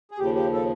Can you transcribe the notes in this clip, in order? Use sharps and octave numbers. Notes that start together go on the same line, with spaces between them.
G#4
D#2 C#3 F3 G4
G4
A4